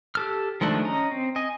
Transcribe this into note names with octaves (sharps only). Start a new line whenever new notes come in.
G4 A4 F6
D#3 F3 G#3 A3 D4
C#4 D#5 A#5
C4
D#5 G#5